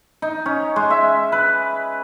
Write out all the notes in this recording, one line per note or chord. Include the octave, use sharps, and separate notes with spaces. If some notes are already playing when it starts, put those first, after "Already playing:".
D#4
C#4
G#3
E5
B4